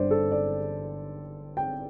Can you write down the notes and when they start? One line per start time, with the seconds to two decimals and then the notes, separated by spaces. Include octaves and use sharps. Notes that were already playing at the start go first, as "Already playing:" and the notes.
Already playing: G1 G2 D3 G3 C5 D5
0.11 A4
0.32 D5
1.57 G5